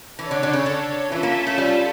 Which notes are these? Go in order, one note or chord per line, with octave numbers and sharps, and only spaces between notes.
E3 D4 A4 C#5
D3
D3
C#3
D3
E3 C#4 F4 A4 E5
A#3
A3
G3